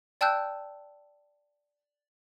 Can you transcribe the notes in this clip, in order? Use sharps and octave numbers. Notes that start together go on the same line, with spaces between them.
D5 G5 A5 E6 F#6 G6